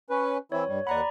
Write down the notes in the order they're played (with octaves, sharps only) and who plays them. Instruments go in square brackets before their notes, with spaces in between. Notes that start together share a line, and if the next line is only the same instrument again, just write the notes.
[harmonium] C#4 B4
[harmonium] E3 C4 E4 [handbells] C#5
[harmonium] G2 G3
[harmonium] D#2 F#5 [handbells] D5 A#5 B5